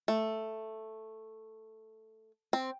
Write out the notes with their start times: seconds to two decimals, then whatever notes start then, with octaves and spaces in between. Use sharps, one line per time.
0.08 A3
2.53 C4